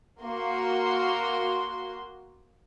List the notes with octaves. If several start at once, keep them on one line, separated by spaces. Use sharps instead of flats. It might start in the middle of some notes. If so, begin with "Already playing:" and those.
A#3 F#4 C6